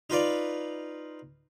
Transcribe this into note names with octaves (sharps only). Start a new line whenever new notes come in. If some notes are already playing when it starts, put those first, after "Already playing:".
D#4 F4 B4 D5